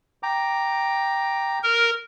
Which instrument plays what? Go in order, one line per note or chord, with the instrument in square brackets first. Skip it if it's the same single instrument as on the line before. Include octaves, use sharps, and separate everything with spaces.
[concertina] G5 A#5 D6
[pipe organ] A#4